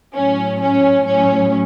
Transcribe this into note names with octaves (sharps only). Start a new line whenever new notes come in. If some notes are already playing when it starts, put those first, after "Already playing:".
A2 F#3 C#4
C#4
A2 F#3 C#4